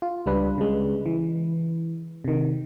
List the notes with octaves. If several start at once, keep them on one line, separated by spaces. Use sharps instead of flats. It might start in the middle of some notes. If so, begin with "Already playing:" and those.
F4
C#2 G3 D4 B4
C#3 G#3
E3
C3 D#3